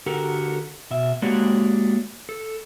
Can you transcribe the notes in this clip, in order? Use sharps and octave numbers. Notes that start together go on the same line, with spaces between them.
D3 F#4 G4 A4 A#4
B2 E5
G#3 A#3 D4 F#4 G4 C#5
A4